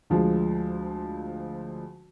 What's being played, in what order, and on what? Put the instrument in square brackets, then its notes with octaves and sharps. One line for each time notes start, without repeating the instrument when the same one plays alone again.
[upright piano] D2 F3 G#3